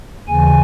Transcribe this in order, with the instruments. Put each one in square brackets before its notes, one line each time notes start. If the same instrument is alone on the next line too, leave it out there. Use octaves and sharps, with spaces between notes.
[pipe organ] D#2 C#3 E3 G#5